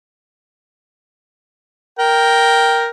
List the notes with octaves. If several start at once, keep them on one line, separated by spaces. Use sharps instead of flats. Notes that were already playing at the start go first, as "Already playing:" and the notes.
A#4 G5